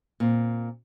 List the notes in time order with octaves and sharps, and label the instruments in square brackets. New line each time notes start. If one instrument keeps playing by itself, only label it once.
[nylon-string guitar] A#2 C4